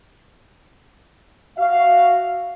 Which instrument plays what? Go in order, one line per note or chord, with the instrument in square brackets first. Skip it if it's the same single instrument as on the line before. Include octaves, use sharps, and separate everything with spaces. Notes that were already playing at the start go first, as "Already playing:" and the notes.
[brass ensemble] F#4 E5 F5